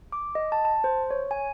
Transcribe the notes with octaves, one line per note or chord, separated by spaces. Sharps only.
D6
D#5
A5
A5
C5
C#5
G#5